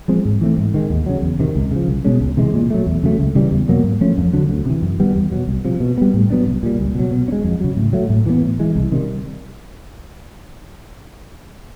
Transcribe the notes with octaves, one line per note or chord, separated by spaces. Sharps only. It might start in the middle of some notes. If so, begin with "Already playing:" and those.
F3 G#3 C4
G#2
E3 A3 C4
G#2
D#3 G#3
D#2
C#3 F#3
E2
C3 D#3
C#2
C#3 F3
C2
B2 G#3 C#4
C#2
C3 E3 G#3
A#2
F#3 A3
E2
C#3 F#3 A3
C#2
C#3 E3 G3
E2
B2 F#3 A#3
G#2
F3 A3 C#4
F2
D3 F#3
D2
C3 E3
F#2
D#3 G3 B3
E2
B2 F#3
C2
C3 F3
B2
G3 B3
A2
F#3 B3 D4
C2
A#2 G3
C#2
B2 F#3
B2
C#4
G#3
F2
C#3 F#3
A2
F#3 A3
A2
E3 G#3 B3
A2
E3 G#3
C2
C3 D#3 G3